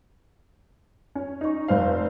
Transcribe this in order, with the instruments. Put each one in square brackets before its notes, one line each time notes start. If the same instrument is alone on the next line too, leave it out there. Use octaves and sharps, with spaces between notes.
[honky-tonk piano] C#4
D#4 C#6
F1 C5 F5